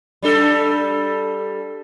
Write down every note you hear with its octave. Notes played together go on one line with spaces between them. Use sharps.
G3 D4 A4